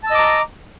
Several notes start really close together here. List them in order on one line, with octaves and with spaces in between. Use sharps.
A5 E6 D#5 D6 A#5